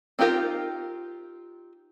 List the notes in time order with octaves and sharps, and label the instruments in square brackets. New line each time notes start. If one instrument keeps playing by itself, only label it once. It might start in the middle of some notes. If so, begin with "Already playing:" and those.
[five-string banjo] C4 D#4 F4 G4 A#4